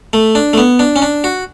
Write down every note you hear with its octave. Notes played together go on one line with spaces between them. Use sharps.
A3
D4
A3
B3
D4
C#4
D4
F#4